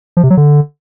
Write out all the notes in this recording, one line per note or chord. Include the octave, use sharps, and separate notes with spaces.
F3
C3
F#3
D3